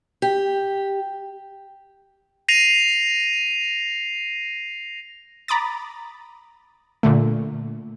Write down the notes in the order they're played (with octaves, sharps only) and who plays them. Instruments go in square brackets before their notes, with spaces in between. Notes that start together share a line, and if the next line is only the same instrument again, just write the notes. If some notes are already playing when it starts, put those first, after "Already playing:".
[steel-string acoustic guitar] G4
[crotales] A#6 C7 D#7 F7
[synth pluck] A#5 B5 D6 D#6 A6
A#2 D3 A3